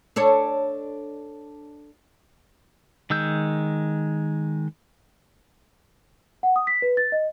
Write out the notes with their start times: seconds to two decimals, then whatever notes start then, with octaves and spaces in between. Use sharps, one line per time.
0.16 D4 A4 C#5
3.10 D#3 G#3 E6 G6
6.43 F#5
6.56 D#6
6.67 B6
6.82 B4
6.97 A6
7.12 D#5